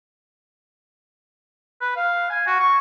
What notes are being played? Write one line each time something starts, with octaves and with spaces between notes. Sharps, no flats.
B4
F5
G#5
F#4
C#6